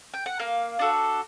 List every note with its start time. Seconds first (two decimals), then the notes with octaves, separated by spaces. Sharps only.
0.14 G5
0.26 F#5
0.39 A#3 F5
0.79 D4 F#4 A4